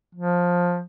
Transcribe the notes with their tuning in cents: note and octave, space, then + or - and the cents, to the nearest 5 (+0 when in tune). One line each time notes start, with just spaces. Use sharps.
F3 +15